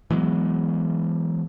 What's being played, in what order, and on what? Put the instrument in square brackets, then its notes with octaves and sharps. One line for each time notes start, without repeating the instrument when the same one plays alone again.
[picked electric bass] E3 F#3 G#3 B3